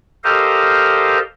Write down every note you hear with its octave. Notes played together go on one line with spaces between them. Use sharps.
G4 A4 A#4 C5 D#5 F5